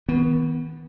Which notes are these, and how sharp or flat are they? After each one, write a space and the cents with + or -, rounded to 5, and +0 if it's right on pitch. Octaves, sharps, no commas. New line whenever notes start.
D#3 +45 B3 +0